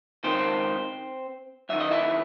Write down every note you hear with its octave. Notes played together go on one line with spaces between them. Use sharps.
C#2 C3 D#3 C4 C5
F#2 D#3 E5
D#5
E4 E5